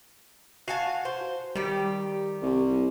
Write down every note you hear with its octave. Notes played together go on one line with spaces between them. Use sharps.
F#4 F5 G#5 A5
C5
D#3 G3 G4
C2